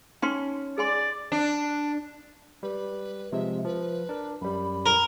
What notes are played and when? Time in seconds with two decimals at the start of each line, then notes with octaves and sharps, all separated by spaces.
0.22 C#4 D#4 G5 C6
0.78 G#4 D5 G#5 C6
1.32 D4
2.63 G3 B4
3.32 C3 F3 G#3 E5
3.65 F3 B4
4.09 D4 A#4
4.42 F#2 G3 B5
4.86 A#4